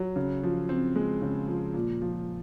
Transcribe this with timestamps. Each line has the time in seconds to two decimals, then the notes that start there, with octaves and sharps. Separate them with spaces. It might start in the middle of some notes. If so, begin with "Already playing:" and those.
Already playing: F#3
0.16 C#3
0.43 F3
0.69 C4
0.96 G#3
1.22 C#3
1.48 F3
1.74 A#2
2.02 F3